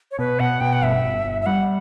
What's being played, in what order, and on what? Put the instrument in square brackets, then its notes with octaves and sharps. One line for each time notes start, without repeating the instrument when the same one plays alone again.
[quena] C#5
[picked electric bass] B2 [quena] B4
[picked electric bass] B2 [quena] F#5
[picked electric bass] B2 [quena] G5
[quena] F#5
[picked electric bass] G1 [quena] E5
[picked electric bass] G1
G1
[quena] E5
[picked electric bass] G3 [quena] F#5